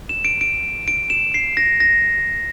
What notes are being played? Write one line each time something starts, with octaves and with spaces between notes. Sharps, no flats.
E7
D7
D7
D7
E7
C7
A#6
A#6